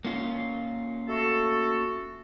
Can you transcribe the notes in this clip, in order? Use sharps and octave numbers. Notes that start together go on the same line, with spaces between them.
A#3 C#4 F4
A3 F#4 A4